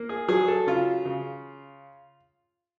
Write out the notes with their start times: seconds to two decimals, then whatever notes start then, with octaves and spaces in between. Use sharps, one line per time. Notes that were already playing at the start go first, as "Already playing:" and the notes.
Already playing: A#3
0.09 G#4
0.28 F#3 G#4
0.48 A4
0.67 C#3 F4
1.05 C#3